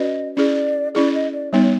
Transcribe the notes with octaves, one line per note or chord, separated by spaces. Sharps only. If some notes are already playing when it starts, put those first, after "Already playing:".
Already playing: C#4 F#4 B4 D5 D#5
C#4 E4 G#4 D5
C#4 E4 G#4 D5
D#5
D5
G3 B3 D#4 C#5
C#5